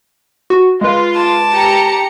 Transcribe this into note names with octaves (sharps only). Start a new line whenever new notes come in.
F#4
G#3 F4 B4
A5 D6
G4 A#5 C#7